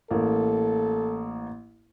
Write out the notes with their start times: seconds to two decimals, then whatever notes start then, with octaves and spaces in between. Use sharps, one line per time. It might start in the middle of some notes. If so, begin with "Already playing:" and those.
0.10 A1 A#3 A4